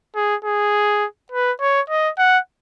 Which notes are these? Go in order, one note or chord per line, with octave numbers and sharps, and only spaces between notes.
G#4
G#4
B4
C#5
D#5
F#5